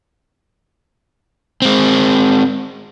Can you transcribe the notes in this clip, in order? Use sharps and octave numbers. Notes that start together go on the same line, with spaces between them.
G#3 C4